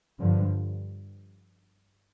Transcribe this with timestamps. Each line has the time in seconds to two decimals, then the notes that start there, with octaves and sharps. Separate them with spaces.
0.20 G2 D3 F3